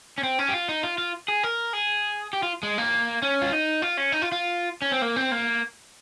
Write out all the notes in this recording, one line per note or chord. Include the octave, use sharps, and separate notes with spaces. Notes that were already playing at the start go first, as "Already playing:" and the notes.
C#4
C4
C#4
G4
F4
D#4
F4
F4
G#4
A#4
G#4
G4
F4
G#3
A#3
C#4
F4
D#4
F4
C#4
D#4
F4
F4
C#4
C4
A#3
C4
A#3